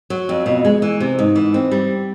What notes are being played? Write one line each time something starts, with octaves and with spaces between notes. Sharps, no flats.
F#3
F2
B2
G#3
E3
C3
G#2
E3
C4
G3